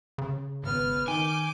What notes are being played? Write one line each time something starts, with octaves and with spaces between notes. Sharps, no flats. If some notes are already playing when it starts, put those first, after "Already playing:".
C#3
G#1 B3 F6
D#3 G#5 D6 G6